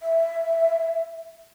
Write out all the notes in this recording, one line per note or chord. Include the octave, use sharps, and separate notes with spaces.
E5